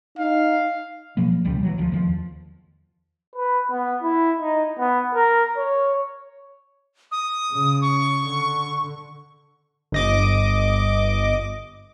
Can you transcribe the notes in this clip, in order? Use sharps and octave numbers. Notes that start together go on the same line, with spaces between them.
D#4 F5
B2 F3 F#3 A#3
E1 C#2 G3
E3 F#3
D2 F3
E2 D#3 F3
B4
B3
E4
D#4
B3
A#4
C#5
D#6
C#3
C#6
D3
G1 D#5 D6